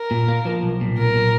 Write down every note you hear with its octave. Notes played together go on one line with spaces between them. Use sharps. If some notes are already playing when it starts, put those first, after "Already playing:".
Already playing: A#4
A#2
A#3
F3
B1
A#2
B1 A#4
A#2